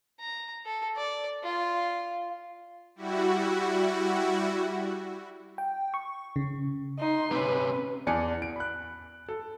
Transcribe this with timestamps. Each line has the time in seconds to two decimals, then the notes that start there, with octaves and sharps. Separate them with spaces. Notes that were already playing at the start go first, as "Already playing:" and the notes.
0.20 A#5
0.65 A4
0.96 D5
1.43 F4
2.95 G3 E4 F#4
5.58 G5
5.94 C#6
6.36 C#3
6.98 D#4 C6
7.32 C3 C#4 B4
8.07 E2 D5 G#5 A5 C#7
8.42 D7
8.56 B5 F#6
9.29 A4